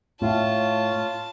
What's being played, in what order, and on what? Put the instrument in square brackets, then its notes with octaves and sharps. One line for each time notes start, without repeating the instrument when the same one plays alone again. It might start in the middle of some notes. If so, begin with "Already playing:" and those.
[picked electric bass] A2 [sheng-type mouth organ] F4 [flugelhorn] C#5 [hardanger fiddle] A5